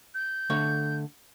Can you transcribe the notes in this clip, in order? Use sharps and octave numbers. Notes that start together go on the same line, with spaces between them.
G6
D3 A3 C#5